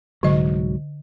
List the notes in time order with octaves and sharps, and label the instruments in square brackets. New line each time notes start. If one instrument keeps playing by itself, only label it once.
[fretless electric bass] C2 G#2 F#3 [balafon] D3 D#5